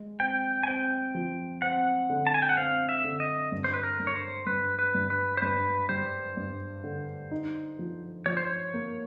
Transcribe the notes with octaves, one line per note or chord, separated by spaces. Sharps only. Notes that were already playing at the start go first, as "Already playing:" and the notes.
Already playing: G#3
C4 G5
G#5
C4 G5
F3
C4 F#5
D3
A5
G#5
G5
F#5
C4 F5
E5
D3
D#5
G2
C5
B4
A#4
G2
C#5
C5
G2 B4
B4
G2
B4
C5
G2 B4
G3 C5
G2
D3
D#4
F3
F3 C#5
C5
C#5
A#3